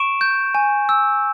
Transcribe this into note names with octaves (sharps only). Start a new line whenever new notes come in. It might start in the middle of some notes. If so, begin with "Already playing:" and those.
Already playing: C#6 D7 E7
G6
G#5
E6